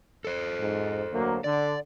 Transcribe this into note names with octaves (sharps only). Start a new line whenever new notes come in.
A4 C5
G#2
D2 F#3 A#3
D3 D5